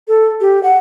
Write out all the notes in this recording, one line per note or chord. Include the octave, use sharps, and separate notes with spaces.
A4
G4
F#5